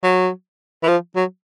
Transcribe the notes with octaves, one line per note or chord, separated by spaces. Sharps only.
F#3
E3
F3
F#3